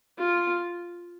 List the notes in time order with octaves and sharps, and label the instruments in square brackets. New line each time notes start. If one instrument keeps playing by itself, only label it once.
[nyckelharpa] F4